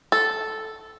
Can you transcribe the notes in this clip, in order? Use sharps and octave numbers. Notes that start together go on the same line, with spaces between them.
A4